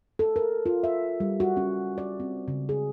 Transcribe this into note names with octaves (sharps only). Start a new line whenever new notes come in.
A4
A#4
F4
E5
G3
F#4
C#4
D5
C4
C#3
G#4